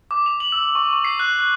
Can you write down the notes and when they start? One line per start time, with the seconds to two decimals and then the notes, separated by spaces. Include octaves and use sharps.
0.11 D6
0.26 F7
0.40 F#7
0.52 E6
0.75 C#6
0.93 C#6
1.04 C7
1.20 F#6
1.39 F#6